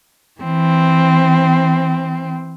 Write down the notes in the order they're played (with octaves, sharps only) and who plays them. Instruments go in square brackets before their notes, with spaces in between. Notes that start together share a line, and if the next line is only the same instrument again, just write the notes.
[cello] E3 C4